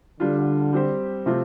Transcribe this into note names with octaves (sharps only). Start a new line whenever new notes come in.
D3 G3 D4 F4
G3 C4 G4 C5
C3 F3 A3 C4 F4